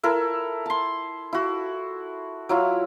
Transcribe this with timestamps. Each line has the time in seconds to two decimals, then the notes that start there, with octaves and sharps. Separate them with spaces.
0.03 E4 A4 A#4
0.66 A5 C6
1.33 E4 F#4
2.49 F#3 E4 F4